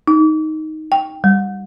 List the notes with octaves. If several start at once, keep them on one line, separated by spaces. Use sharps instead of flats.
D#4
G5
G3